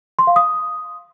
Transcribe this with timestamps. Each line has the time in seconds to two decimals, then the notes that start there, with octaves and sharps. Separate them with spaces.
0.19 C6
0.27 F5
0.36 D#6